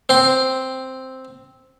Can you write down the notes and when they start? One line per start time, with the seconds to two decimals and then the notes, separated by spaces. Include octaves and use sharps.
0.09 C4 C6